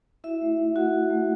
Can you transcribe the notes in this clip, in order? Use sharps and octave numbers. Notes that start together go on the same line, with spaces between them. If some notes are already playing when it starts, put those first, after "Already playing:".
E4 F#4 E5
A3
D#4
A3 F#4 F#5
A3
A3